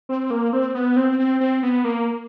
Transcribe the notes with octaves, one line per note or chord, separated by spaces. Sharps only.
C4
A#3
C4
B3
C4
C4
C4
B3
A#3